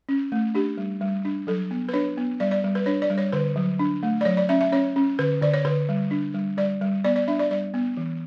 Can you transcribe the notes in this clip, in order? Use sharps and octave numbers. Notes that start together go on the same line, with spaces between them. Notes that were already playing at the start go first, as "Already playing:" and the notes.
C#4
A3
D4 G4
G3
G3
D4
F#3 A4
B3
B4
D4 C#5
B3
G3 D5
D5
G3
B4
D4 C#5
D5
G3
C#5
D3 B4
F#3
D4
A3
D5
F#3 C#5
D5
C#4 E5
E5
C#4 C#5
C#4
D3 B4
D3 D5
C#5
D3 B4
G3
D4
G3
G3 D5
G3
B3 D5
D5
D4 E5
D5
G3 D5
B3
E3